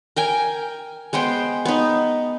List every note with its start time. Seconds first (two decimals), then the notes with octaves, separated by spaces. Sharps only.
0.16 A#4 G5 G#5
1.13 G#3 B3 C5 G5
1.65 B3 D#4